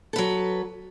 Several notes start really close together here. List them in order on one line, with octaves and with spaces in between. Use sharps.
A4 B4 F#3